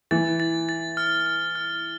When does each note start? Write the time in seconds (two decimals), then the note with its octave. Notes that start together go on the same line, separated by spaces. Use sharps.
0.11 E3 A6
0.40 A6
0.69 A6
0.97 F6
1.26 F6
1.55 F6